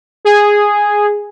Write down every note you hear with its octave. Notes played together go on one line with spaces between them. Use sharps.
G#4